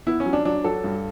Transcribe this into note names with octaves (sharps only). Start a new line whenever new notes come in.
B3 E4
C#4
F#3
D4
F#3 D4
F#3 A4
G2